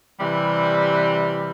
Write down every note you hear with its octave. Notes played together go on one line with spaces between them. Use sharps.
C3 E3 G3
B4